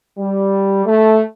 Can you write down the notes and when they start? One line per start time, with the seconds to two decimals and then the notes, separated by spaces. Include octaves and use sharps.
0.18 G3
0.86 A3